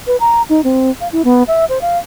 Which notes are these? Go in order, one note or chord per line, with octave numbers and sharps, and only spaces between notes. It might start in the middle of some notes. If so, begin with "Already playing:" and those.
B4
A#5
D#4
C4
F5
E4
B3
E5
C5
F5